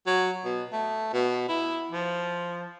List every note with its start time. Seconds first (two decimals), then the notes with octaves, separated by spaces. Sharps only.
0.07 F#3
0.45 B2
0.73 A3
1.13 B2
1.49 E4
1.92 F3